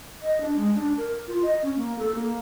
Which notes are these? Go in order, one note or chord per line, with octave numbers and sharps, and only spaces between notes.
D#5
D4
G#3
D4
A#4
F4
D#5
C#4
A#3
A4
A#3